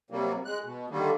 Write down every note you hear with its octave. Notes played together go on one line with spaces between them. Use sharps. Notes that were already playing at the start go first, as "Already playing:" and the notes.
C3 F#3 G3 A#3
G#3 F#6
B2
D3 D#3 G3 A#3